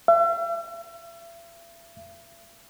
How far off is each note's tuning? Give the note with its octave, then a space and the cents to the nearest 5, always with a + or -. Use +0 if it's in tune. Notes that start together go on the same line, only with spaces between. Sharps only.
E5 +40